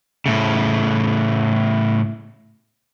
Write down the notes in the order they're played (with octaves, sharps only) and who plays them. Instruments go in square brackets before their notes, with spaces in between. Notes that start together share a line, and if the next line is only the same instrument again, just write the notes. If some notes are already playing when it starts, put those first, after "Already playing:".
[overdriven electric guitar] A2 C#3